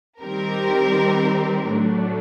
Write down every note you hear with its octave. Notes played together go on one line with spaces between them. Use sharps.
D#3 G3 C4 G4 A#4
A2 F#3 A3 D4